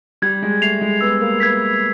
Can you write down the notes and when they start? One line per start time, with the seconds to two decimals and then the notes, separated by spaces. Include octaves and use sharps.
0.22 G3 G#6
0.42 G#3
0.62 A3 C7 F7
0.81 G#3
1.01 B3 E6
1.21 A#3
1.40 B3 G#6 B6